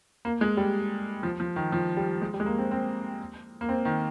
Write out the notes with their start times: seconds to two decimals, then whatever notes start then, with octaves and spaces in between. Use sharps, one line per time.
0.25 A#3
0.41 G#3
0.57 G3
1.23 F3
1.40 F3
1.56 D#3
1.72 F3
1.97 G3
2.22 G#3
2.34 G3
2.40 G#3
2.46 A#3
2.58 C4
2.71 C4
3.61 A#3
3.69 C4
3.85 D#3